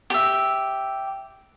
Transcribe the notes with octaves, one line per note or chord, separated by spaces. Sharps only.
G4 E5